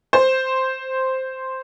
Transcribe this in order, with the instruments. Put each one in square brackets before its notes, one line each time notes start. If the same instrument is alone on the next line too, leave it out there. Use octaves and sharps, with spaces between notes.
[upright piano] C5